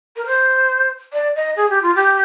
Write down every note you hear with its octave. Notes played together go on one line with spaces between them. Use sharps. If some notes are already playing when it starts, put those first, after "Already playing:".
A#4
C5
D5
D#5
G#4
G4
F4
G4